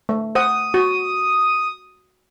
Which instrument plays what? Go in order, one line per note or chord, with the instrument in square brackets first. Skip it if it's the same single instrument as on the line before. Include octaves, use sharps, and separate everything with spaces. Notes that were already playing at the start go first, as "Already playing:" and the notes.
[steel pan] A3
[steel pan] C5 F#5 [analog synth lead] D#6
[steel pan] F#4